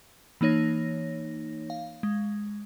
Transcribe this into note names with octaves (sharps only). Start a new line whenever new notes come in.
E3 A#3 D#4 C#5 A#6
F5
G#3